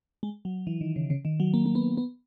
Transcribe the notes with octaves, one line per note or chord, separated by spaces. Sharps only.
G#3
F#3
E3
D#3
C#3
C#3
D#3
F#3
A#3
A#3
B3
B3